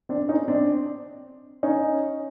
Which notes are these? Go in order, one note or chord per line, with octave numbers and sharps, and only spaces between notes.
C4 D4
C#4 D#4
C4 D4
C#4 D#4